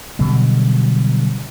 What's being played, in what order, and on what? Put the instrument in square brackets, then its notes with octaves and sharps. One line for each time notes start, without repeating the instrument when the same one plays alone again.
[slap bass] B2 D3 F#3 G3